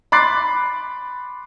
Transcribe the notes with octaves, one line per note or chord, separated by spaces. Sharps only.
B5 C6 D6 F#6 A6 C7